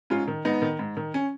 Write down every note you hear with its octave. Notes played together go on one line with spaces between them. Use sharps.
G#2 C#4 F4
D#3
G#2 B3 D#4
D#3
G#2
D#3
C#4